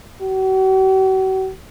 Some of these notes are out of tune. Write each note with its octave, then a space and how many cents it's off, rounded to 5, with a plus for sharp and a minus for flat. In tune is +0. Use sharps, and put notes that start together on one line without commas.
F#4 +45